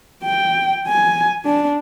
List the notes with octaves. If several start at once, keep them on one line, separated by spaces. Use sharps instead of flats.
G5
G#5
D4